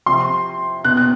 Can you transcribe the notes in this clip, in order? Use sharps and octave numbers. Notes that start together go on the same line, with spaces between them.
C3 F3 C6
B2 F#6
F#6